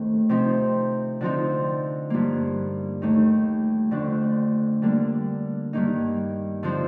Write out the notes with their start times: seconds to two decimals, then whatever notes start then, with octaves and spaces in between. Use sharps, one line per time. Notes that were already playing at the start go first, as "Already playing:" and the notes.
Already playing: D#2 D#3 A3 C4
0.29 C3 F3 C4 D#4
1.21 D3 F3 C4 D#4
2.10 G2 F3 A#3
3.02 D#2 D#3 A3 D#4
3.91 F2 D3 A3 D4
4.82 D3 G3 A#3 D4
5.73 G2 D#3 A#3 D#4
6.63 D3 F3 C4 D#4